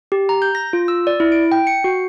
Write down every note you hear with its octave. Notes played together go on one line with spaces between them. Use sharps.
G4
A#5
G6
A#6
F4
E6
D5
E4
D7
G5
C#7
F#4